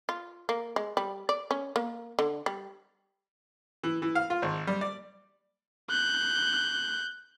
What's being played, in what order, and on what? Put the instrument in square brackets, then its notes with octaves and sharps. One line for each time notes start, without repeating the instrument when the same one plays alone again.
[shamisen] F4
A#3
G#3
G3
D5
C#4
A#3
D3
G3
[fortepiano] E3
E3
F5
F4
G#1
G3
D5
[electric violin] F#6 G6